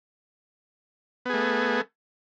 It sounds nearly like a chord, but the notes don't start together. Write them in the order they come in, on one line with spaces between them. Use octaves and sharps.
B3 G#4 A3